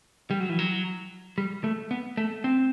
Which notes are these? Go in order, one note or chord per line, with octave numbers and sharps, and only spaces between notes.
G3
F#3
E3
F#3
G3
A3
B3
A3
C4